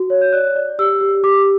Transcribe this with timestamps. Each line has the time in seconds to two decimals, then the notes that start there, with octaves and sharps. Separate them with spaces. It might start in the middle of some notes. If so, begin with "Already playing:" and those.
Already playing: F#4
0.10 C#5
0.21 G6
0.33 D5 F#6
0.56 D5
0.79 G4 E6
1.01 G4
1.24 G4 D6